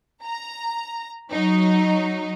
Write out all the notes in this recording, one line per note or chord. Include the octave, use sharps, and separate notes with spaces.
A#5
F#3 D#4